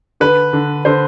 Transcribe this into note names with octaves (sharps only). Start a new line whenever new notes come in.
D3 B4
D3
D3 C5